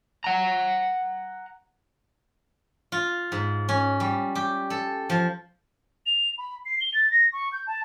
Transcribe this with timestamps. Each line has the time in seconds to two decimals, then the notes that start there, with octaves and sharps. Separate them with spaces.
0.24 F#5 A#5
2.92 F4
3.32 G#2
3.69 C#4
4.00 G3
4.35 G4
4.70 A4
5.10 F3
6.06 F7
6.38 B5
6.65 C7
6.81 G7
6.94 A6
7.11 A#6
7.33 C#6
7.53 G6
7.67 A5